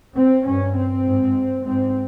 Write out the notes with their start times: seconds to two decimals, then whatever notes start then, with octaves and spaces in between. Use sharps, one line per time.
0.16 C4
0.45 G2 C#4
0.75 C4
1.06 G#2
1.65 G#2 C4